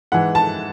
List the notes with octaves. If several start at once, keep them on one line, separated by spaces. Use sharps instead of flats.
G#2 E3 F#5
A5